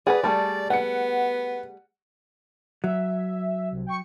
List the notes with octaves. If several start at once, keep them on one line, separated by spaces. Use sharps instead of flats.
G#4 A4 B4 D5 F#5
G3 A3 G#4 A5
B3 F#5 C#7
F#3 E5
C2
G5 C#6 C#7